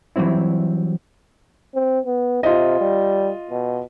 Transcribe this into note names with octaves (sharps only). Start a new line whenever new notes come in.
E3 F#3 G3 C4 E4
C4
B3
C3 F4 D#5
G3
B2